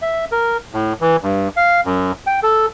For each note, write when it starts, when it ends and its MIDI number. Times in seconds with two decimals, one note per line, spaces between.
0.02 0.25 76
0.32 0.57 70
0.74 0.93 45
1.01 1.16 52
1.23 1.48 43
1.57 1.81 77
1.85 2.12 42
2.27 2.40 79
2.43 2.66 69